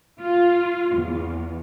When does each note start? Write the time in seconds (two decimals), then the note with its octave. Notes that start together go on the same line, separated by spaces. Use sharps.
0.23 F4
0.97 E2